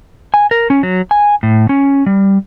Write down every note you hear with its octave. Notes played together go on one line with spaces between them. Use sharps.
G#5
A#4
C#4
F#3
G#5
A2
C#4
G3